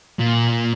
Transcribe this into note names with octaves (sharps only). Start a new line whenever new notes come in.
A#2